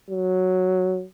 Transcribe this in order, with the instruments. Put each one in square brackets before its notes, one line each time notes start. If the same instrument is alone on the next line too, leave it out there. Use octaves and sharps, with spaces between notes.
[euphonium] F#3